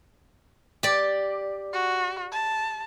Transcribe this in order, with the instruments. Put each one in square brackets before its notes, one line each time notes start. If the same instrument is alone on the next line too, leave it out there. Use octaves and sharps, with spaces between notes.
[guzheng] G4 D5
[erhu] F#4
A5